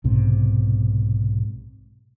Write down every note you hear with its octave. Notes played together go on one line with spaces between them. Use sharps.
B1 G#2 C3